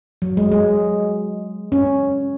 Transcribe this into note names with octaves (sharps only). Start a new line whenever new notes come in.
F#3
G#3
G#3
C#4